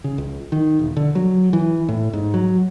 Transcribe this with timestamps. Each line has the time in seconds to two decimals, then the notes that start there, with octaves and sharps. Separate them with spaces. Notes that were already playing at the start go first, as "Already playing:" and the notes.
0.04 C#3
0.18 C#2
0.52 D#3
0.79 E1
0.97 D3
1.15 F#3
1.53 E3
1.89 A2
2.13 G#2
2.34 F#3